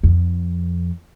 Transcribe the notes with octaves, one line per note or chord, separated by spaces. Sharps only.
F2